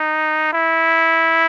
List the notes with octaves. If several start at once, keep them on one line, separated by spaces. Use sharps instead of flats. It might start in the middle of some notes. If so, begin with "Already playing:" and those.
Already playing: D#4
E4